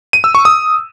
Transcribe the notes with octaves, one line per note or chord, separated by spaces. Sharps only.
D#7
E6
C#6
D#6